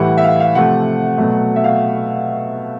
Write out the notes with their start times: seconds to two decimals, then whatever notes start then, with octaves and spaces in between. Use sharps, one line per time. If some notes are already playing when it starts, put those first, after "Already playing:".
Already playing: A2 E3 G3 F#5
0.18 E5
0.24 F5
0.40 F5
0.55 C3 F3 A3 F#5
1.18 B2 F#3 A3
1.56 E5
1.64 F5